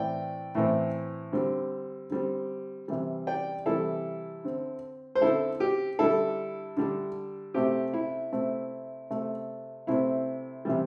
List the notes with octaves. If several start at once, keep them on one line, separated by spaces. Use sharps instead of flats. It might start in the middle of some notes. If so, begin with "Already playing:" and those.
Already playing: A2 E3 C4 D5 G5
A2 E3 C4
D3 G3 C4
D3 G3 C4
C3 E3 G3
D5 G5
C3 E3 G3 E4 A4
D3 C4
C5
D3 C4 E4 A4
G4
D3 G3 D4 E4 A4
D3 G3 D4
C3 A3 C4 G4
E4
C3 A3 C4
C3 A3 C4
C3 A3 C4 E4
C3 E3 G3